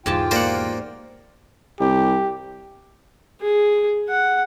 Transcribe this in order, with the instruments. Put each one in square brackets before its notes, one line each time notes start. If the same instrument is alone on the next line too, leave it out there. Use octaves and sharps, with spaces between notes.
[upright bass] E2 B2 [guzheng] G#2 G4 A5 [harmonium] F4 G5
[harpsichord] A#3 A#4 D5 [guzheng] C5 F#5
[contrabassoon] C2 [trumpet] G4
[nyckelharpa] G#4
F#5